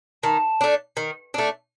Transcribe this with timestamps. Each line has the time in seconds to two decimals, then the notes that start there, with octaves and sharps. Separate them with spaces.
0.23 D#3 A5
0.61 A3 D4
0.97 D#3
1.34 A3 D4